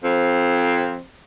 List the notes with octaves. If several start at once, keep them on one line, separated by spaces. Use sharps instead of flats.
F2 C4